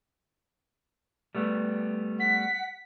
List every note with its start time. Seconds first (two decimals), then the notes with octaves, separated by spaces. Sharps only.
1.35 G3 A3 B3
2.20 F#5 B6